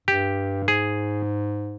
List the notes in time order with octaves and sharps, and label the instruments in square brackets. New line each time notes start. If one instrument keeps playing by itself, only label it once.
[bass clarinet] G2 [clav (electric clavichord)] G4
[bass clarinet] G#2 [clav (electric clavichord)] G#4